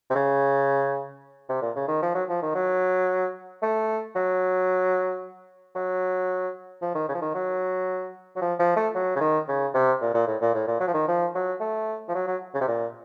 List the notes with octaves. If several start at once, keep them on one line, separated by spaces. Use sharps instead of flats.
C3
C#3
C3
A#2
C#3
D#3
F3
F#3
F3
D#3
F#3
A3
F#3
F#3
F3
D#3
C#3
F3
D#3
F#3
F#3
F3
F3
A3
F#3
C#3
D#3
C#3
C3
A#2
A#2
A2
A#2
A2
A#2
F#3
F3
D#3
F3
F#3
A3
F3
F#3
F#3
C#3
C3
A#2